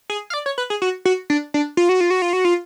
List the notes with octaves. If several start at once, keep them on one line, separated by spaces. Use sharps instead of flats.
G#4
F5
D5
C#5
B4
G#4
F#4
F#4
D4
D4
F4
F#4
F4
F#4
F4
F#4
F4